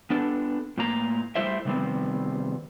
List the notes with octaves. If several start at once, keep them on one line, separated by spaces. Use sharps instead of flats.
B3 D4 A4
A2 A#3 A#5
G3 A3 E4 C5 E5
C3 D#3 G3 B3 C4